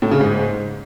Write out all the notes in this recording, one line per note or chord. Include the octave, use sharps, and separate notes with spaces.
A2
C#3
G#2